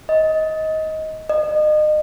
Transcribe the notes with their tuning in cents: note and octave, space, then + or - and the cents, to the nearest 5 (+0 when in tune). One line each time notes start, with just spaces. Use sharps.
D#5 +20
D#5 -35